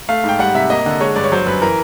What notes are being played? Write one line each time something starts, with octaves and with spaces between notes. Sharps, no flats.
A3 F5
G#2
G5
G3 F#5
C3 E5
A#3 D#5
D3
G#3 C#5
G2 D5
C#5
F#3 C5
F#2 B4
E3 A#4